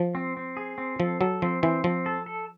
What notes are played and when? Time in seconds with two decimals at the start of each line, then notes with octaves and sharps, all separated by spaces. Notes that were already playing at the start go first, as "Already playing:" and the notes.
Already playing: F3
0.15 C4
0.37 C4
0.57 G#4
0.78 C4
0.99 F3 A4
1.21 F#3 A4
1.42 F3 C4
1.63 E3 C4
1.84 F3 C4
2.06 A4
2.26 A4